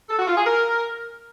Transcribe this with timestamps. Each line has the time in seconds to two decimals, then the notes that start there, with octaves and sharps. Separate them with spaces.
0.09 A4
0.18 F#4
0.27 F4
0.37 G#4
0.46 A#4